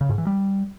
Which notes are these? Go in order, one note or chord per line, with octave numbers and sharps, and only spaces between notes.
C#3
G#2
E3
G3